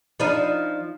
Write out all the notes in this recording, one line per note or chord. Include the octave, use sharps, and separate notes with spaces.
F3 D4 D#4